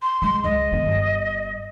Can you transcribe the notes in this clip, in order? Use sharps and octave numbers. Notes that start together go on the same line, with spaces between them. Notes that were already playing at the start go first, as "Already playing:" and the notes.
C6
G#3 C6
C#2 D#5
D#3 B3
G1